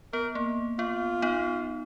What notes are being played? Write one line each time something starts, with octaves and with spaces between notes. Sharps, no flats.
B3 A#4
A#3
B3 F4
B3 D#4